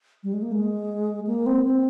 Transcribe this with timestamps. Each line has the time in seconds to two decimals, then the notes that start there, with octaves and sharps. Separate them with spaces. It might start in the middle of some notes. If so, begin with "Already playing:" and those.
0.24 G3
0.33 G#3
0.42 A#3
0.52 G#3
1.27 A#3
1.46 C4
1.65 C4